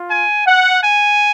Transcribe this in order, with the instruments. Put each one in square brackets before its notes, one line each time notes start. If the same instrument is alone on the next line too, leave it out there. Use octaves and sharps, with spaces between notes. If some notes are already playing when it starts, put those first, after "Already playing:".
Already playing: [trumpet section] F4
G#5
F#5
G#5